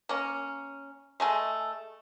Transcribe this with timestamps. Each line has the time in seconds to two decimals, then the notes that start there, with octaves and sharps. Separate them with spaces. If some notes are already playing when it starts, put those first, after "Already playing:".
0.09 A#3 C#4
1.20 G#3 A3 G#5